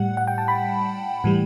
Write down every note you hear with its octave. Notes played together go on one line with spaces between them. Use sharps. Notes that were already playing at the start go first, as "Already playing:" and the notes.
Already playing: A2 G3 F#5
F#5
G5
A5
B5
A2 E3 G3